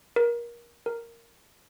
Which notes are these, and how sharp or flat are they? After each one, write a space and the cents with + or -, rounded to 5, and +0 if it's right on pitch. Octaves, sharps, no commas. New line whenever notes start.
A#4 +25
A#4 -5